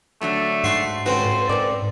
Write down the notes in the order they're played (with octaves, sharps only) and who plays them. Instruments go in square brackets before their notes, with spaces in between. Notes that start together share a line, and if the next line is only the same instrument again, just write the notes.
[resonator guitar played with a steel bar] D3 F#3 D4 [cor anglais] A3
[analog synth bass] G#2 [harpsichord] F#4 C6
[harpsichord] C#2 C4 B4 [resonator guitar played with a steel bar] F#4 A4 [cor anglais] C5
[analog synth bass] G#2 [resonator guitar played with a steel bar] A4 A#4 D5